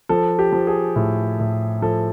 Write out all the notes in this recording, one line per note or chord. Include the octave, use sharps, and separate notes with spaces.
F3 A4
G4
F3
G#4
A2
A2
F3 A4